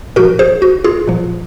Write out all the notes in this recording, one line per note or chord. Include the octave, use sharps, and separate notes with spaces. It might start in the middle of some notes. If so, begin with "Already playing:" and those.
A#2 F3 F#4 A#4
G#4 C5
F#4
F4 G#4
A#2 F3